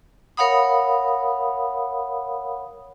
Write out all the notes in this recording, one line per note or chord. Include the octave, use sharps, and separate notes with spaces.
A#4 C#5 F5 F#5 B5 D#6